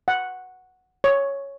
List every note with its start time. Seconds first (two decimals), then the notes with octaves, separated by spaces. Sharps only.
0.08 F#5
1.04 C#5